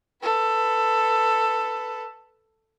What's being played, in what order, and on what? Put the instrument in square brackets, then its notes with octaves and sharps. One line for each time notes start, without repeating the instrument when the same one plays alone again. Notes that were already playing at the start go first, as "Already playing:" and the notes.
[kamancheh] A4 B4